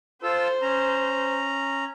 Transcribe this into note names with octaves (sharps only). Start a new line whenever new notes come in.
F4 A4 C5 E6
C#4 A#5